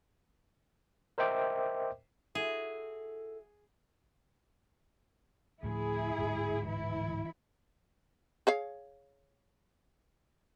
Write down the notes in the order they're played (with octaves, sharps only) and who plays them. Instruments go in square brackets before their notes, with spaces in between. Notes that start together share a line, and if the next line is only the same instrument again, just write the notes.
[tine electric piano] A#4 C5 D#5 E5 G5 D6
[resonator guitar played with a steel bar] E4 F#4 [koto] G#4 [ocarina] A4
[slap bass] D2 A2 F3 [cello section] E4 G#4
[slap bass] D1 G#2
[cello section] E3 E4
[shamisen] G#4 C#5 F5